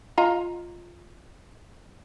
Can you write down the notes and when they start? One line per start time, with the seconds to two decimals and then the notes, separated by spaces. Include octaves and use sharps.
0.18 F4 D#5 A#5